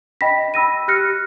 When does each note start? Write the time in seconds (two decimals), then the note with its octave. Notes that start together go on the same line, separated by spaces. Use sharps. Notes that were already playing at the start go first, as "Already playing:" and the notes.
0.21 D#5 G5 B5 A#6 B6
0.54 B5 E6 A#6 D#7
0.88 G4 F6 F#6 A#6 C#7